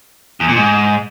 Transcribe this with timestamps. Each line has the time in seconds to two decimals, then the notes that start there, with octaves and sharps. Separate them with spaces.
0.40 E2
0.48 A#2
0.56 G#2